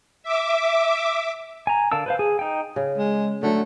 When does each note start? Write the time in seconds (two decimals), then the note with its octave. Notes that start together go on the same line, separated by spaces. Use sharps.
0.23 E5 D6
1.67 G#5 A#5
1.92 D3 A#4 F5 A5 E6
2.06 B4 C5 F5
2.19 G#4
2.39 D#4 G5
2.76 C#3
2.98 G#3
3.43 D3 F#3 A3 C#5